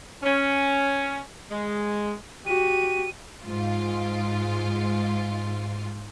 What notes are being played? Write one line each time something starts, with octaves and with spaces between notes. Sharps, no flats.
C#4
G#3
F#4 G4 D#7
G#2 F4